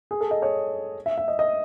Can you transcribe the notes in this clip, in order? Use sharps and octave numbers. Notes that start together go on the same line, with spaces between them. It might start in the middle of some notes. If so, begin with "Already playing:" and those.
G#4
A4
D#5
C#5
E5
E5
D#5
D#5